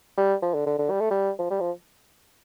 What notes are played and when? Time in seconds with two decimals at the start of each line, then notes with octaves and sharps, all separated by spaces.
0.17 G3
0.42 F3
0.54 D3
0.66 D3
0.79 D3
0.90 G3
1.00 A3
1.11 G3
1.39 F3
1.50 G3
1.60 F3